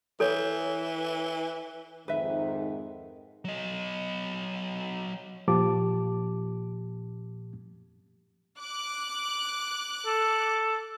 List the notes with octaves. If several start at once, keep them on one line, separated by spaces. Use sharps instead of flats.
E3 A4 C#5
F2 G#2 D#3 B4 E5
F#3 D#5
A#2 F3 G4 A5 D6
D6 F#6
A4